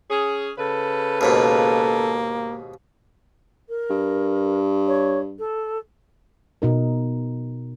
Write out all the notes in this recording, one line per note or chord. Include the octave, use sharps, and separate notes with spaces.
C#4 G#4
C#3 A4 B4
D#2 G#2 B2 A#3 A4
A#4
G2
C#5
A4
B2 D#4 A#4